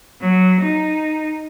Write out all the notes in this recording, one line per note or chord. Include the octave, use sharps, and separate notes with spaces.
F#3
D#4